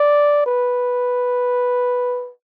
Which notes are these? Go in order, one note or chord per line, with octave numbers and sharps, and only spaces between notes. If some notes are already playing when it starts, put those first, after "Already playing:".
Already playing: D5
B4